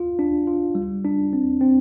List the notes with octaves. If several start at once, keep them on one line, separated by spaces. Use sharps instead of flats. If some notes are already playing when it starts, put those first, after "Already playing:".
Already playing: F4
D4
F4
G3
D4
C4
C4